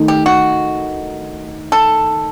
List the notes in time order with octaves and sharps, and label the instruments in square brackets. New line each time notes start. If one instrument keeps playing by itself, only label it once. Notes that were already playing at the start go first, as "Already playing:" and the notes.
Already playing: [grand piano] D#3 A3 D#4
[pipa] G4
F#4
A4